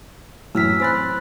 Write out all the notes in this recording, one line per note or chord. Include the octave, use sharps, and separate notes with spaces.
F#2 A2 E3 E6 F6 B6
C4 G#5 B5 F#6 A6